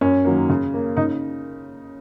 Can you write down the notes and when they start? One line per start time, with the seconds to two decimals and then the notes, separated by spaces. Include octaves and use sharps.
0.01 F#2 C#4
0.25 D#3 F#3 A#3
0.50 C#3
0.74 A#3
0.97 C#3 D#4